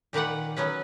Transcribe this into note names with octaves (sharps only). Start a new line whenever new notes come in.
A#2 D#3 B4 D5 F#5
F#3 B3 C#4 B4